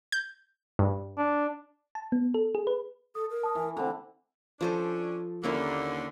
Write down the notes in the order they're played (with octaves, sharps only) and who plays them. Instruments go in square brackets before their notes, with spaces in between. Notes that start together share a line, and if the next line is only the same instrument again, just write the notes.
[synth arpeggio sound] G6
G2
[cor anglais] D4
[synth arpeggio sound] A5
B3
A4
G#4
B4
[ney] A4 [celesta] D#6
[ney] A#4
[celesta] A5 D#6
[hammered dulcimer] E3
[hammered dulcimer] D3 C4 [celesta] E4 [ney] B5
[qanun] F3 A4 C5 [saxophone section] C#4 D4
[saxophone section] D#2 D3 [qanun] A#3 C#4 E4